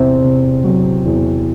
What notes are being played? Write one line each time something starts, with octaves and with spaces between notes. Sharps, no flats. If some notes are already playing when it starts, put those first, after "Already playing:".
Already playing: E2 C3 C4
C3
F#3
E2